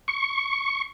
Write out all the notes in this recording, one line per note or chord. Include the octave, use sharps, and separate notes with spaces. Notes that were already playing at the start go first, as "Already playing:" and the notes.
C#6